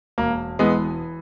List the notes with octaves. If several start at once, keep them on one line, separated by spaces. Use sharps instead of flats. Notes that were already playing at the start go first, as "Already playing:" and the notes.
E1 A#3
E3 G#3 B3